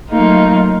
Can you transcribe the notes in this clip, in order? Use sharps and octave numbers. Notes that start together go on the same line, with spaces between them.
F#3 A3 A#3 D#4 F4